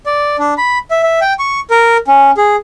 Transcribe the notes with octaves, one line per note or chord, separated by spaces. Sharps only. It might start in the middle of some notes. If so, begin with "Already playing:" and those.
D5
D4
B5
E5
E5
G5
C#6
A#4
C#4
G#4